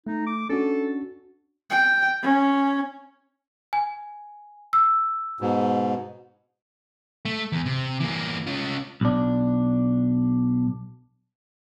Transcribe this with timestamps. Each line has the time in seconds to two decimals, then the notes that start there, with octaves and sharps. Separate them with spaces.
0.07 A3 D#4
0.27 D6
0.50 C#4 D4 F#4 A4
1.70 G5
2.22 C#4
3.73 G#5
4.73 E6
5.41 G#2 B2
7.25 A3
7.52 E2
7.66 C3
8.00 E3 A#3
8.47 C#4 F4
9.01 B1 D4